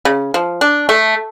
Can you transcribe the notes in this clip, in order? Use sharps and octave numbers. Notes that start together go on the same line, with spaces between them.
C#3
F3
D4
A3